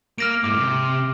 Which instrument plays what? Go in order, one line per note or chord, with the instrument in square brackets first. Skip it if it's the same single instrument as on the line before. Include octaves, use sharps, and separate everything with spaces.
[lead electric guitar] A#3 [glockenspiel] F6 A#6 D7
[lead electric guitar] G#2 E4 [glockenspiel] D6
[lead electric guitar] C3